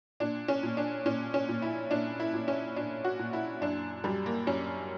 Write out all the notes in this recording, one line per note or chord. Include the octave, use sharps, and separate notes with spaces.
A#2 D4
C#4
A#2
D4
A#2 C#4
C#4
A#2
E4
A#2 D4
E4
A#2
C#4
A#2 D4
F#4
A#2
E4
F#2 D4
F#2 G3
A#3
F#2 C#4